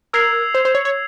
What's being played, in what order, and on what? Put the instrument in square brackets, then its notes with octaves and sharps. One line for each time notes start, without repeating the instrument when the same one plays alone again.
[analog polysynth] A#4 [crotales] E6 G#6 C7 F7
[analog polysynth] C5
C5
C#5
C#5